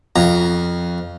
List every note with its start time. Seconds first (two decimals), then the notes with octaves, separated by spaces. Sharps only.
0.16 F2 A#5